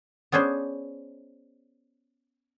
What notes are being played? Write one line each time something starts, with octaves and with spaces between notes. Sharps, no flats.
B3 C#4 D4 G#4 C5